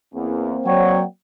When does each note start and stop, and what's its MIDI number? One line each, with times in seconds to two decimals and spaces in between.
0.14 0.57 40
0.14 1.03 58
0.14 1.03 60
0.66 1.03 54
0.66 1.01 73
0.66 1.02 74
0.66 1.02 78
0.66 1.02 79